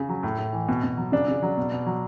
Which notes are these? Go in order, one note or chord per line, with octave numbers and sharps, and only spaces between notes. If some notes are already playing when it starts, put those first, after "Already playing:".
Already playing: C#3
F#3
A2
A2
E3
B2
B2
F#3
C#3 D4
C#3
F#3
B2
B2
F#3